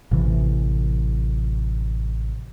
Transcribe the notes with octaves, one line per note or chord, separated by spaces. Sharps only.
A1 C3 E3